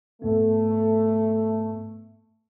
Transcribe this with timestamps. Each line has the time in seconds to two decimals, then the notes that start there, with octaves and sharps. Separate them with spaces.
0.22 G#2 A3 B3